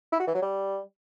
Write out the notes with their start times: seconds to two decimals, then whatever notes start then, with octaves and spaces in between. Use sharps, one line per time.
0.12 E4
0.20 F#4
0.27 E3
0.34 F#3
0.42 G3